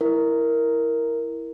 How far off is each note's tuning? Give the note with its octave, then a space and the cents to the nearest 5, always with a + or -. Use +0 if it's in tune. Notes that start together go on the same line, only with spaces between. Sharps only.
E4 +0 A#4 +0